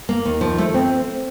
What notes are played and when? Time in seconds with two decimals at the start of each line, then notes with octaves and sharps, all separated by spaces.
0.09 A#3
0.26 D#2
0.41 F3
0.58 A3
0.74 C4